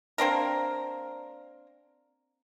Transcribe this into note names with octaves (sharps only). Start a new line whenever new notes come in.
A#3 C4 D4 A#4